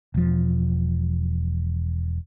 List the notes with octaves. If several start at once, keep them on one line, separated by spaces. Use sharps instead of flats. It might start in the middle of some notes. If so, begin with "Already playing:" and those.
E1 F3